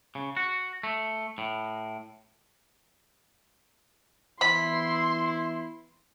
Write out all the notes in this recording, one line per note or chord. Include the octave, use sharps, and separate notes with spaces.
C#3
F#4
A3
A2
E3 B3 E4 B5 C6